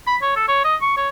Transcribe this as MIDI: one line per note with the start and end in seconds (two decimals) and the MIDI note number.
0.07 0.16 83
0.22 0.34 73
0.36 0.44 69
0.48 0.62 73
0.65 0.75 75
0.82 0.96 85
0.97 1.09 73